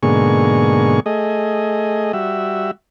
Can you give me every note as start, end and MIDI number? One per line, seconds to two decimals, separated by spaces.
0.03 1.00 44
0.03 1.00 47
0.03 1.00 50
0.03 1.00 58
0.03 1.00 68
0.03 1.00 85
1.06 2.12 57
1.06 2.12 68
1.06 2.12 75
2.13 2.71 55
2.13 2.71 66
2.13 2.71 76